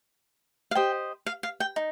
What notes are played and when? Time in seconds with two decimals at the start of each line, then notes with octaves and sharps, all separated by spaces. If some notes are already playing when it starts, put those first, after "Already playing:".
0.71 F5
0.75 G4 C5 D#5 G5
1.26 F5
1.43 F5
1.60 G5
1.76 D#4